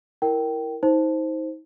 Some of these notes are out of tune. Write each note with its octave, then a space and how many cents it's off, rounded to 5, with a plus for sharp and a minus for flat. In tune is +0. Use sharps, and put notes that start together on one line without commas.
E4 +0 A#4 +0 G5 -15
D#4 +35 C5 +0